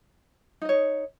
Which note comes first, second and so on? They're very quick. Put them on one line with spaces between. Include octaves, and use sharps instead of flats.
D#4 D#5 C#5